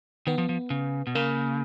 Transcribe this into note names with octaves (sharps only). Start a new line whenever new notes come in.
D#3 B3
F3
F3
C#3
B2
C#3 A#3